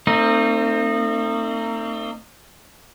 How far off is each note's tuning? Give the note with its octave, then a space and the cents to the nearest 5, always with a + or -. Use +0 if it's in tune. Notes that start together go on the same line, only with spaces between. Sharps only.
A3 +45 C4 +0 D#4 -25